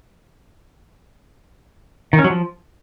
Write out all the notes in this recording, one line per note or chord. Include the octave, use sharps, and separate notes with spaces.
D#3
C#4
F#3
F3